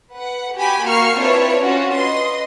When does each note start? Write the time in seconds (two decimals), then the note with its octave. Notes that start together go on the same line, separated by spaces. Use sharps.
0.14 B4 F#5
0.56 F#4 G4 G5 G#5 B5
0.86 A#3 F#4 C#6 F6 C7
1.18 C4 D4 E4 F4 B4 C#5
1.62 C#4 F4 F#4
1.97 B4 D#5 C6